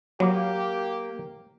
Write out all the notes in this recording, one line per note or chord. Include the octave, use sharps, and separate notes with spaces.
F#3 A#3 G4